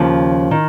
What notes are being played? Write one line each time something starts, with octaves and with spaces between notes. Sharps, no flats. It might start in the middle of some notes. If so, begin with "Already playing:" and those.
Already playing: D#2 C#3 F3 C#4 F4
D#3